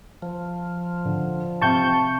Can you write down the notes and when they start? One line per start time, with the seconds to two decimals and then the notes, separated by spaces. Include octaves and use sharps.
0.22 F3
1.05 D3
1.62 C3 E5 G5 A5 C#6 G6